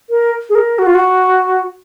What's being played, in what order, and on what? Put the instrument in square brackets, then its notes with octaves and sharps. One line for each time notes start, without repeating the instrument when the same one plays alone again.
[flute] A#4
G#4
A#4
F#4
F4
F#4